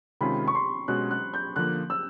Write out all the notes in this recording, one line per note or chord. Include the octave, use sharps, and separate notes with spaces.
C3 D#3 G#3 C#4 F4 B5
C#6
C6
B2 G#3 C#4 F#4 F#6
F#6
G6
D3 F3 A#3 F#6
E6